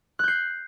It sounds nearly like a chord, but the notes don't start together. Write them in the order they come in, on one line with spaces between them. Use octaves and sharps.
F#6 G6 C7